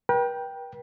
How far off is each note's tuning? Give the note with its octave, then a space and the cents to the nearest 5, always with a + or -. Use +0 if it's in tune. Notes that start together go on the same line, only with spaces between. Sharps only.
B4 -45 G5 +0